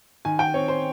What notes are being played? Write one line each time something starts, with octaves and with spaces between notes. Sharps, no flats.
D#3 G#5
G5
C4 C#5
C5